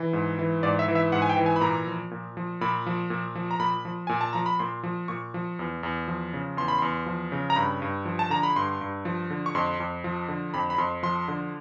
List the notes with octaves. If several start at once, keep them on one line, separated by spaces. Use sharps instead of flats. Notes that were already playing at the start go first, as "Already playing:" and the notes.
Already playing: E3
G#2
E3
G#2 D5
E5
E3
E5
G#2 F#5
G#5
G5
E3
G#5
B5
A#2 A#5
F3
A#2
F3
A#2 B5
F3
A#2
F3
A#5
A#2 B5
F3
A#2 G#5
A5
F3 A#5
B5
A#2 C6
F3
A#2 C#6
F3
E2
E2
F3
C#3
E2 C6
B5
E2 C6
F3
C#3
A#5
G2 B5
G2
F3
A5
D3 A#5
B5
G2 C6
G2
F3
D3
C#6
F2 C6
F2
F3
D3
F2 B5
B5
F2 C6
F3 C6
D3